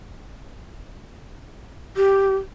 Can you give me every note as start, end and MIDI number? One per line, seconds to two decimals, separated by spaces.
1.97 2.35 67